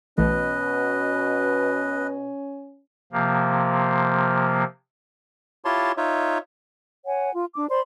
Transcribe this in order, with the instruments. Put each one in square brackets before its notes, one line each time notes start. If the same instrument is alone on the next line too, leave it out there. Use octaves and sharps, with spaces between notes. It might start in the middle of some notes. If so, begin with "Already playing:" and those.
[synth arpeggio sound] B1 E3 A3 [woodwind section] B2 [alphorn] C#4 [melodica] B4 D#5
[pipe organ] C3 F3 A#3
[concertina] E4 F4 G4 C#5 A5 C6
D#4 F4 C#5 E5
[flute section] C#5 F#5 G#5
F4
D4 D6
C5 D5 B5 C6